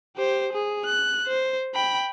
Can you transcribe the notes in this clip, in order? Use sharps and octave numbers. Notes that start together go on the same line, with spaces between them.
G4 C5
G#4
F#6
C5
G5 B5